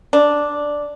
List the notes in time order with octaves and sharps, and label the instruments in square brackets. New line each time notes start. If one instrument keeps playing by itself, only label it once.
[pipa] D4